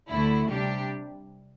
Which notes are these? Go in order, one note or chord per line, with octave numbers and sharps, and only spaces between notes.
D2 D3 A3 E4
C3 G3 D4 G4